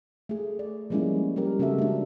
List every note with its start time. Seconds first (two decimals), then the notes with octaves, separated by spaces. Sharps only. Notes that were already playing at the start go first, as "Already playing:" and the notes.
0.29 A3 G#4
0.59 D5
0.90 F3 G3 G#3 A#3 C#4 E4
1.36 G3 C#4 G4 A#4
1.59 C#3 G#3 C4 F#4 A4 E5
1.79 A3 D4